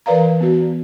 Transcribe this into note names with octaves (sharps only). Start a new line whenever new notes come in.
E3 A#4 B4 D5 F5 A#5
B3 F#4